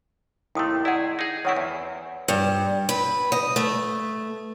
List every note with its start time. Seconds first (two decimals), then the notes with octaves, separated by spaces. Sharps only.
0.55 D#2 C3 A3 E4 D#6
0.85 E4 G#4 D5 D#5 F#5
1.19 D#4 G#4
1.45 D#3 C4 E4 C#5 F#5 C#6
1.56 E2
2.28 G2
2.89 B4
3.32 D#5
3.56 A3